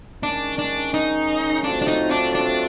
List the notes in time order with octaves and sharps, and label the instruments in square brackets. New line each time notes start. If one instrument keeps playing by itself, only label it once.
[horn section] D#3 G#3 C#4 [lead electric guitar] D4
[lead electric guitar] D4
D#4
[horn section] A2 F#3 A3 C4 F4 [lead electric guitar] D4
[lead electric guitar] D4
D#4
D4
D4